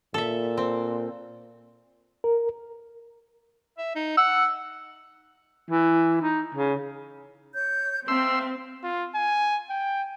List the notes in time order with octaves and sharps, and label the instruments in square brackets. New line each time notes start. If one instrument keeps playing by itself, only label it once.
[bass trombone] A#2 [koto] A4 E5
[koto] C4
[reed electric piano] A#4
[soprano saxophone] E5
D#4
[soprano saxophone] F#5 [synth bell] E6
[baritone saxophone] E3
D#4
C#3
[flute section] C#5 G6
[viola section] C4 [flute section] F4 E5 A5 [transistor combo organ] C6 E6
[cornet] F4
G#5
G5